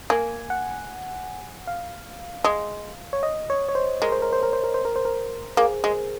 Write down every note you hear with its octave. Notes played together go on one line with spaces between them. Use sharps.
A#3 G#5
F#5
F5
G#3
C#5
D#5
C#5
C#5
C5
G#3 A#4
C5
A#4
C5
A#4
C5
A#4
C5
A#4
C5
A#4
A#3 G#4
G#3 G#4